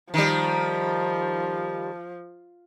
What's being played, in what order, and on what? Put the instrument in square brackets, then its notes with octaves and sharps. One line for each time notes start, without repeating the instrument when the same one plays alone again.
[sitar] D#3 G3 [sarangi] F3